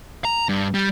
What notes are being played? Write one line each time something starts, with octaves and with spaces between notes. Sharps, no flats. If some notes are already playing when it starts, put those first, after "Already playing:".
A#5
G2
G3